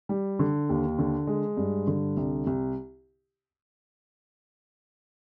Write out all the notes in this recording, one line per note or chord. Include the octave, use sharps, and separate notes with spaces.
G3
D3
D#2
D3
G#3
G2
D3
C2
C2